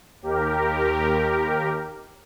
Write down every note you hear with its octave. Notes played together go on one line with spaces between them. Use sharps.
D#2 G4 A#4